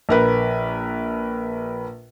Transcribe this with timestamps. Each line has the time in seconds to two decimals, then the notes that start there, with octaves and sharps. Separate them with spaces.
0.09 A#1 A#4 B4